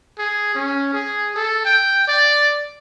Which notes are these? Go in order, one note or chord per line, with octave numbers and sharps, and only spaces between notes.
G#4
C#4
G#4
A4
G5
D5